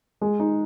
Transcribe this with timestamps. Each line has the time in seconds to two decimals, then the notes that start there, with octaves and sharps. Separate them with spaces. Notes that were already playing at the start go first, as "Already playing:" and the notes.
0.21 G#3
0.40 D#4